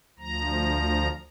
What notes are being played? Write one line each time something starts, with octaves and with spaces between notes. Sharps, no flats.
D2 F3 A#5